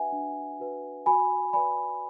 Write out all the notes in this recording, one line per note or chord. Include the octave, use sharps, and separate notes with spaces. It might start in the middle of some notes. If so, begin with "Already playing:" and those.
Already playing: D4 F#4 B4 E5 F#5 G#5
D4
F#4 B4
F#4 G#5 B5
B4 D5 G#5 B5